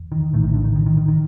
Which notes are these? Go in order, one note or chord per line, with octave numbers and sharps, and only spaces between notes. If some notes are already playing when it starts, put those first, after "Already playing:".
Already playing: E2
D#3
A#1 A2 D#3
D#3
D3
D#3
D#3
D#3
D#3
D#3